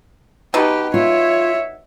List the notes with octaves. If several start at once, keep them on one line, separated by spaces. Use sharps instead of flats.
B2 D#4 G4 B4
F4 C#5 E5